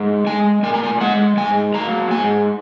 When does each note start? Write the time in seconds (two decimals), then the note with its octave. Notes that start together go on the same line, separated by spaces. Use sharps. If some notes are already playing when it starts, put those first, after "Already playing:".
Already playing: G#2
0.27 G#3 G#5
0.63 A#2 G#5
0.74 A#5
0.84 G#5
1.00 G#3 F#5
1.37 G#2 G#5
1.74 F#3 A#3 A#5
2.11 G#2 G#5